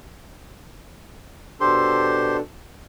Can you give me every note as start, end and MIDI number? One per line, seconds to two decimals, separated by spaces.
1.61 2.40 47
1.61 2.40 62
1.61 2.37 67
1.61 2.40 69
1.61 2.37 72
1.61 2.37 84